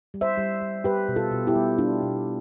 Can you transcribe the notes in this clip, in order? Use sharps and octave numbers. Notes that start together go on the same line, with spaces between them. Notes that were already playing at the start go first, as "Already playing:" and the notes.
G3
C5 E5
G3
G3
G3 G4 B4
B2
F4 A4
B2
E4 G4
G3
G3 D4 F4
B2